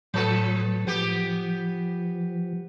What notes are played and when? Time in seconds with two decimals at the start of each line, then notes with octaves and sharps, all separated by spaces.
0.14 A2 F3 F#3 A4 B4
0.87 F3 B3 G4